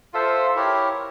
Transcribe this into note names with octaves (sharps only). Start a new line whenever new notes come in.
F4 A4 C5 E5
E4 G4 A#4 C#5